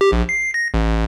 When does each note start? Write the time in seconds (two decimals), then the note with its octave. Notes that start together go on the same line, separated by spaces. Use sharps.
0.01 G4
0.12 A#1
0.29 C7
0.54 A#6
0.74 A1